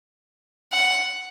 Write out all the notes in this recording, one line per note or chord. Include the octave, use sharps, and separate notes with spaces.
F#5